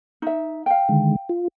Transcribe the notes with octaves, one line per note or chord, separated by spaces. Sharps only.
D#4 E5
F5 G5
D3 D#3 G#3
F4